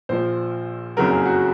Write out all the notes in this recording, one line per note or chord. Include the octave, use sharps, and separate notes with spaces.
A#1 A#2 F3 C5
F#1 F2 C#3 F#3 A#4
G#4
F#4